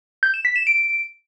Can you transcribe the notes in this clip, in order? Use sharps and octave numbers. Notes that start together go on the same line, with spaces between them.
G6
E7
B6
E7
D7